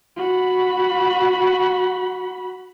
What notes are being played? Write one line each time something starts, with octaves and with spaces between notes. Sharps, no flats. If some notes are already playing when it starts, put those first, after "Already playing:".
F#4 B5